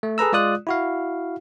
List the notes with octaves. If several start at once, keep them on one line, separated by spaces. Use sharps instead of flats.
A3
G#4 A4 B4 A#5 E6
G#3 F4 D5 D#6 F#6
E4 F#4 F5